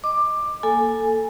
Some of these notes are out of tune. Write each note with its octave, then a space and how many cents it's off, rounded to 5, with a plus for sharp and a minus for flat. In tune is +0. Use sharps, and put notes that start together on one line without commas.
D#5 +0 D6 +15
A#3 +0 A4 +0 G#5 +0